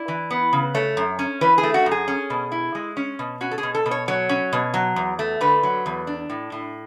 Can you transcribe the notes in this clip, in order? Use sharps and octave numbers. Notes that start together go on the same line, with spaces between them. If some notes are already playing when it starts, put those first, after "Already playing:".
Already playing: E4 D5
E3
B3
C#3
A3 C#5
F#2
C#4
E3 B4
G#4
A3
F#4
F#2
G#4
C#4
B2
E4
G#3
C#4
B2
C#4 F#4
A4
G#4
B2
A4
B2
C#5
F#3 C#5
C#4
B2
F#3
E2
A3
D3 B4
F#3
E2
D4
A2
A2